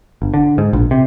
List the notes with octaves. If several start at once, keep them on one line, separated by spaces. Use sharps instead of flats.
G1
D3
G#2
A#1
C3